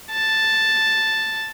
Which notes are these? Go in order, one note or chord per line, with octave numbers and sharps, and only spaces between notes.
A5